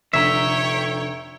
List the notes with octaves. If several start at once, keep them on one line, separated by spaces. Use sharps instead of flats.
F1 D3 C#5 E5 G5 A#5